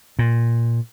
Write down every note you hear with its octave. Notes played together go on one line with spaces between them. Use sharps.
A#2